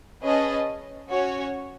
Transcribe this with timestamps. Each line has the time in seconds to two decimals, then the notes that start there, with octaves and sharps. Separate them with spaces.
0.22 C#4 G#4 B4 D#5 A5
1.10 C#4 F#4 C#5